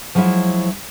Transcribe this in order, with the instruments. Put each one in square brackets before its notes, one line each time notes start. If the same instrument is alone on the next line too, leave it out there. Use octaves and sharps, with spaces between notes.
[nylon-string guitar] F3 F#3 G#3 E4 F4 E5